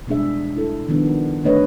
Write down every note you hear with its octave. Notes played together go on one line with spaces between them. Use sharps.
B2 G3 G#3 D4 G#4 E5
E4 A4
D#3 F3 G3 B3 D4
D3 A3 D4 B4 C#5 D#5